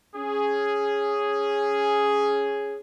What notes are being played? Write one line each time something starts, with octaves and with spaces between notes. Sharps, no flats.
C#4 G#4